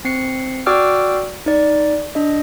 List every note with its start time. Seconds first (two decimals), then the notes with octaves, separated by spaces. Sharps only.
0.05 C4 C7 C#7
0.66 F#4 D5 G5 D6 E6 F6
1.46 D#4 D5
2.15 D4 D#5